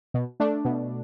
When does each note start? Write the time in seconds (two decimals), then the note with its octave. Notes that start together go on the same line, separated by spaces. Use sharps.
0.14 B2
0.40 A3 D4
0.65 B2